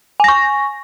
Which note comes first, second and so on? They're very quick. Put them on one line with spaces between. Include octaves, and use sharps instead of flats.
G#5 A#6 C#6